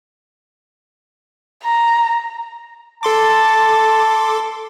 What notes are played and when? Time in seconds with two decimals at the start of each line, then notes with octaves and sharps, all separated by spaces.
1.64 A#5
3.03 A4 A5 C6 D6